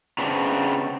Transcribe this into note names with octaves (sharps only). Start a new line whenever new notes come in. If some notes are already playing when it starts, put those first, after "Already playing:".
C#3 B3 C4 D4